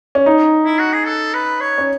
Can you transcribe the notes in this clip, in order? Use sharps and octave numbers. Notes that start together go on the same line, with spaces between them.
C#4
D#4
E4
F#4
G#4
A4
B4
C#5
C#4